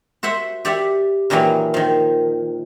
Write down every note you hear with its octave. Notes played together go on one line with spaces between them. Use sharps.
F#4 C5 E5 F#5
G4 D5 E5 F#5
A#2 D#3 E3 F#3 A#3
D#3 F3